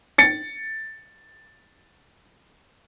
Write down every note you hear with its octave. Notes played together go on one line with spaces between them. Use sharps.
A6 C#7